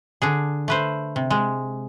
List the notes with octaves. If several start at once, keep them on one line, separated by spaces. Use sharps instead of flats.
D3 D4 G#4
A3 B4 C5
C3
G#3